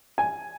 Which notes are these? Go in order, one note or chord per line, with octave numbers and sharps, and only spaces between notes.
G#5